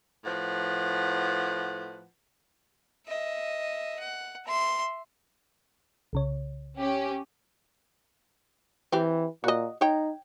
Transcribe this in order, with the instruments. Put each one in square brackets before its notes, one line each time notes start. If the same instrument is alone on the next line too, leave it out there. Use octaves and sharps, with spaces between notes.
[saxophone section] A2 F3 B4 F#5
[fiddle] D#5 E5
F#5
E5 C6
[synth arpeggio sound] C2 C#3 C#5
[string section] C#4 G4
[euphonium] E3 [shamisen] C4 G4
[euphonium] A#2 [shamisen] F#4 D#5
[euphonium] D#4 [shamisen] C#5 G5